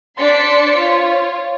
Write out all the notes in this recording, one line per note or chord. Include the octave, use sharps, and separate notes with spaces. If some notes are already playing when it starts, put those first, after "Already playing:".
D4 C5 D5 C6 B6 C#7
F4 C#5